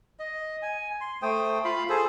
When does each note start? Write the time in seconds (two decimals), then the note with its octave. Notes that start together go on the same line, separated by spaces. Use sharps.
0.19 D#5
0.62 G#5
1.01 C6
1.22 A3 C5 G5 D#6
1.65 F4 F5 B5
1.89 G#4 A4 C5